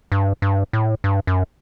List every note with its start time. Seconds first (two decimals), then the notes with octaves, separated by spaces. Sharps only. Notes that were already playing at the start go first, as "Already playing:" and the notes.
0.12 G2
0.42 G2
0.73 A2
1.04 G2
1.27 F#2